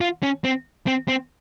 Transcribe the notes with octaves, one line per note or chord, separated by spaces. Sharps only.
F4
C#4
C4
C4
C4